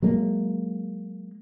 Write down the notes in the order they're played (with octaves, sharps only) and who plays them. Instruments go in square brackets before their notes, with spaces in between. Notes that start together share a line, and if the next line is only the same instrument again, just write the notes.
[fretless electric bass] F#3 G#3 A#3